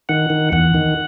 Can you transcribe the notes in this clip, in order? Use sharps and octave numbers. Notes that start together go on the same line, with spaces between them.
D#3 F#5
D#3
E2 F#5
D#3